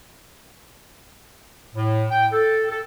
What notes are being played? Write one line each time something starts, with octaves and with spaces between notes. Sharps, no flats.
A2
G5
A4
A4